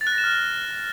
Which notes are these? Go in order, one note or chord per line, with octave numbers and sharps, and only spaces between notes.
A6
F#6
A#6
E7
F6